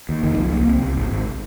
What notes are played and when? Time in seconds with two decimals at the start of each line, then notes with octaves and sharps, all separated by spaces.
0.09 D#2
0.23 F1 D#3
0.38 C2 F3
0.52 C2 A#3
0.67 C2 C4
0.81 C2
0.97 G#1
1.11 G#1